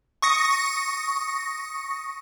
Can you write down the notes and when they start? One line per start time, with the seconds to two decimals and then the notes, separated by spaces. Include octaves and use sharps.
0.22 C#6 D#6 A#6 C#7